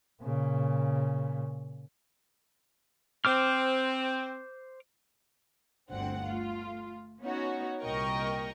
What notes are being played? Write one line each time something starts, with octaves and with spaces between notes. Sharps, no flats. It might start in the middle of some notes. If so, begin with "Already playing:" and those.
A#2 C#3
C4 C5 D6 F6
G1 D2 D3 C4 F#5
A3 F4
B3 C#4 D#4 F#4 C#5
C2 A#2 A#4 D#5 G5 C#6